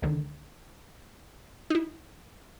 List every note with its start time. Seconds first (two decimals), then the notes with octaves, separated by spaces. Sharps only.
0.02 C#2 D3 D#3
1.70 D#4 E4